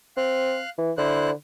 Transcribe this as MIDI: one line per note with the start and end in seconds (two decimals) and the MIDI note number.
0.17 0.60 60
0.17 0.70 77
0.17 0.70 90
0.78 0.92 52
0.98 1.32 50
0.98 1.30 64
0.98 1.30 72
0.98 1.30 90